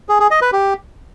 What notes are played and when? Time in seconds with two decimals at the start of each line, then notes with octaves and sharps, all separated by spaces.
0.09 G#4
0.20 G#4
0.31 D#5
0.42 B4
0.53 G4